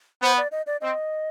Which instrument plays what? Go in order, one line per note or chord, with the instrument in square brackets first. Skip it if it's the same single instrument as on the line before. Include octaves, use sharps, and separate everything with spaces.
[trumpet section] B3 [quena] C5
[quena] D5
D#5
D5
[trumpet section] C4 [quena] D#5